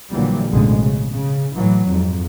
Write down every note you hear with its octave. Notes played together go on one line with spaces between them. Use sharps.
A#1 A#2 D3 E3 F#3 G3
A1 F2 B2 D3 G#3
C#3
C#3
A2 E3 F#3
F2 G#2